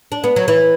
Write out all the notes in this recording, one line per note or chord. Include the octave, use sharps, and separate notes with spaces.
D4
B3
F#3
E3